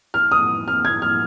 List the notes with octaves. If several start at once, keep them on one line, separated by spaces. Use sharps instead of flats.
F6
D#6
F6
G#6
F6